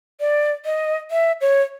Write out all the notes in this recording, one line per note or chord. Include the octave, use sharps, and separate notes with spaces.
D5
D#5
E5
C#5